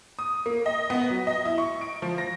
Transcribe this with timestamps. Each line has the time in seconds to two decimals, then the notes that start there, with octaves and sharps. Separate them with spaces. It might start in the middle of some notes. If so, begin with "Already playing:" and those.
0.19 D#6
0.46 A#3
0.66 D#5
0.90 B3
1.10 F#3
1.27 D#5
1.45 E4
1.58 C#6
1.81 D7
2.02 F3
2.18 A#6